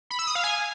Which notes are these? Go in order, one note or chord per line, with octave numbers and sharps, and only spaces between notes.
B5
E6
D#6
F5
G#5